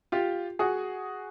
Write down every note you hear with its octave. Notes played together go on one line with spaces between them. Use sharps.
F4 G4
F#4 G#4